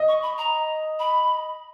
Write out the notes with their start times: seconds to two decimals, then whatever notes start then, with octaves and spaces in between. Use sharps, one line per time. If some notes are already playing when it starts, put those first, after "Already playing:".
Already playing: D#5
0.08 C#6
0.23 B5
0.38 A#5
0.99 B5